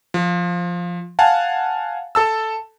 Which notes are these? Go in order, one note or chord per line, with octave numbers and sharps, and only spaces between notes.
F3
F5 F#5 G#5 A5
A4 A5 E6